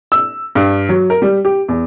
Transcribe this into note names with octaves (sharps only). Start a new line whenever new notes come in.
E6
G2
F#3
A#4
G3
G4
E2